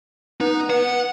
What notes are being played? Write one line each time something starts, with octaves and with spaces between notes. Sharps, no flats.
B3 D#4
B3 F#5